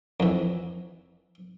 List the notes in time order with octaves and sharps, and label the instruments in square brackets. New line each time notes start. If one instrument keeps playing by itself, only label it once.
[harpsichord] F2 E3